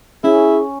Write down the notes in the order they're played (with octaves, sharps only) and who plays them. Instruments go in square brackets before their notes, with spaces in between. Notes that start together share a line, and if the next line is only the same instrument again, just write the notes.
[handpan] C#4 [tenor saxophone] E4 [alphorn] G#4